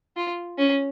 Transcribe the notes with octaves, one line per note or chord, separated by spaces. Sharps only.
F4
C#4